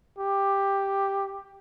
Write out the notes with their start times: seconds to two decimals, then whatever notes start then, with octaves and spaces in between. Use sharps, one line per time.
0.19 G4